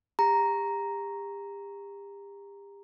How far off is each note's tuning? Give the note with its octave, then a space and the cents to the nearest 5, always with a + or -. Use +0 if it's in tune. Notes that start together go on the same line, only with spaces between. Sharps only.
G4 +35 A#5 +0